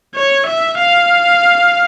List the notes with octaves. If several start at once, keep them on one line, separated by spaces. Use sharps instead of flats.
C#5
E5
F5